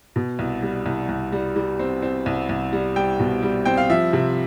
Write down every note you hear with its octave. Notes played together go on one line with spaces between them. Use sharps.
B2
C2
G3
C2
C2
G3
G3
C4
C4
C2
C2
G3
G3 G5
B2
G3
C4 G5
F5
F3 E5
C3